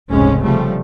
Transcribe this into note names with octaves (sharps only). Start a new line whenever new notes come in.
F1 C#2 G#2 G#3 C#4
C#3 F3 G3 A3